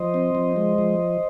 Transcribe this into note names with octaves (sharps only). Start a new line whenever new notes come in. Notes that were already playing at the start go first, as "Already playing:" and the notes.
Already playing: F3 C5 D#5
C4
F3
G#3
F3